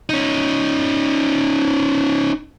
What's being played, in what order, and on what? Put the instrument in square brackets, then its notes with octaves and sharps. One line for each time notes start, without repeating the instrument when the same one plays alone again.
[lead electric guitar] C#4 D#4